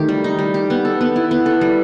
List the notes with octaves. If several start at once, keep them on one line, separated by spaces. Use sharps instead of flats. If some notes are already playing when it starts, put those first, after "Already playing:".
Already playing: D#3 A3 G4
G3
D#4
G3
G4
B3
A4
B3
E4
B3
A4
G3